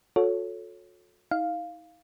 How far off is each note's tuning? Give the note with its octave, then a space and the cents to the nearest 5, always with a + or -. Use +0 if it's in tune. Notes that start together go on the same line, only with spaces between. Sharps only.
F#4 -45 A4 -5 C#5 +0
D#4 +40 F5 +0